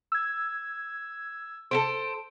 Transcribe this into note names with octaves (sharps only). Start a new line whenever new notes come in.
E6 G#6
A4 B4 C5 D7